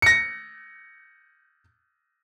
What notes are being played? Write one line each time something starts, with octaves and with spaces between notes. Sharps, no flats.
A#6 C#7